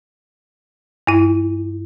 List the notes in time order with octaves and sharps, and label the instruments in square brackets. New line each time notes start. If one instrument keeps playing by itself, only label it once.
[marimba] G2 E4